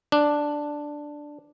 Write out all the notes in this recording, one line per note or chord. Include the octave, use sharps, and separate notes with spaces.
D4